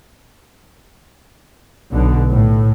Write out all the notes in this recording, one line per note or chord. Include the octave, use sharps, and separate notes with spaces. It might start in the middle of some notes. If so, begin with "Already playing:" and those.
B1 B2 D3
A2